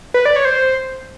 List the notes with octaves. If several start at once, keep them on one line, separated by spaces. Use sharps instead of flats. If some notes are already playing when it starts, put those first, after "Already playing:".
B4
D5
C#5
C5